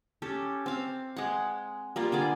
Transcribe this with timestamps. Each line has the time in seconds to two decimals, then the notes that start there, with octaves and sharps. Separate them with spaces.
0.22 C#4 G4 A4
0.66 C4 F5
1.16 G#3 F#5
1.96 G3 A#3 F4
2.12 D3 G#4 D5